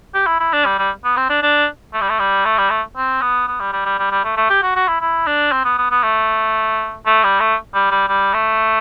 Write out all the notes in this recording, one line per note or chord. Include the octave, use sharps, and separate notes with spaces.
G4
E4
E4
D4
G3
G3
B3
C4
D4
D4
A3
G3
A3
G3
A3
G3
A3
C4
B3
B3
G3
G3
G3
G3
G3
A3
A3
G4
F#4
F#4
E4
E4
D4
C4
B3
B3
B3
A3
A3
G3
A3
G3
G3
G3
A3